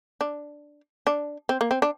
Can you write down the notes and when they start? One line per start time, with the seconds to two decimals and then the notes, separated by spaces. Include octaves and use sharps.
0.21 D4
1.07 D4
1.49 C4
1.61 A#3
1.71 C4
1.82 D4